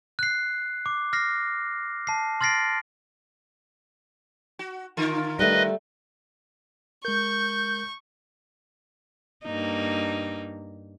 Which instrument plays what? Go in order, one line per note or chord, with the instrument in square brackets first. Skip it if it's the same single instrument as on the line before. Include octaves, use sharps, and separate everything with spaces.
[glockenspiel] F#6 C7
D6
F6 A#6 C7
A5 C7
C6 F6 A6 A#6 C7 D7
[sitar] F#4
D3 F4 A#4
[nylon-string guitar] G3 A3 [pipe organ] B4 D#5
[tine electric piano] G#3 A#4 [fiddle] C#6 [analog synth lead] G6
[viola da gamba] G2 A#3 D#4